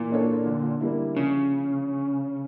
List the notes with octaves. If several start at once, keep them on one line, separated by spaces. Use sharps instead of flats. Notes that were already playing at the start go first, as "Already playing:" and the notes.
Already playing: A#2 E3
A#3 D4 A4 C#5
D3
G3 A#3 E4
C#3 F3